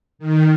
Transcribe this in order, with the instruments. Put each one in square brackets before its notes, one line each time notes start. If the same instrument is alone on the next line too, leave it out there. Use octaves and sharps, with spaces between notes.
[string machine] D#3